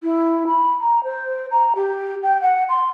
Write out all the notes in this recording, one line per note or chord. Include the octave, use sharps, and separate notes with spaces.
E4
B5
A#5
C5
A#5
G4
G5
F#5
C6